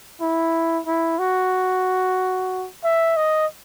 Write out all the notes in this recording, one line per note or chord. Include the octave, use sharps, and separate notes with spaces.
E4
E4
F#4
E5
D#5